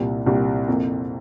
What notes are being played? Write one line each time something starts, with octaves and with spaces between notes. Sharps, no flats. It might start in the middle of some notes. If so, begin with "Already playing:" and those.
Already playing: C2 A#2 G3
C2 A#2 G3
F2 C3 F3 A#3